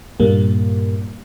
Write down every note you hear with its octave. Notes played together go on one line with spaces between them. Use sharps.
G2 A#2 G3 A#3